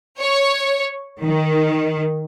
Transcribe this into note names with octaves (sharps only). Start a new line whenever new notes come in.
C#5
D#3